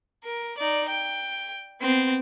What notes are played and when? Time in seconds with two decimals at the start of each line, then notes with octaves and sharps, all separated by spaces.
0.24 A#4
0.57 D#4 D5
0.89 G5
1.81 B3 C4